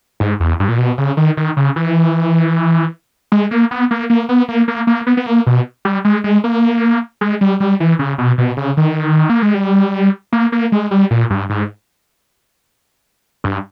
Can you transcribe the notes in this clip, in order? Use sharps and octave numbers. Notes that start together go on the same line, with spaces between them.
G#2
E2
G2
A#2
B2
C#3
D#3
D#3
C#3
E3
G#3
A#3
B3
A#3
A#3
B3
A#3
A#3
A#3
B3
B3
A#3
B2
G3
G#3
G#3
A#3
G#3
G3
G3
E3
C#3
B2
B2
C#3
D#3
A#3
G#3
G3
A#3
A#3
G#3
G3
A#2
G2
G#2
G2